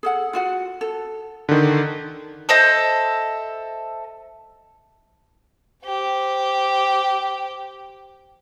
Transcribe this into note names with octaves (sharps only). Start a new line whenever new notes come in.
G#4 A4 F#5
F4 F#4 F#5
A4
D3 D#3
A4 C5 D#5 E5
G4 C5